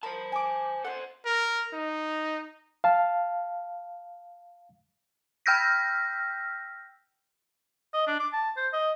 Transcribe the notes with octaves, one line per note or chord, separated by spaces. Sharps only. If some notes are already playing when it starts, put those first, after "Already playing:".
A#4 C5 A5 B5
G#5 D6
A4 C5 F#5 C6
A#4
D#4
F5 A5
G5 E6 F6 G6 A#6 B6
D#5
D4
D6
A5
C5
D#5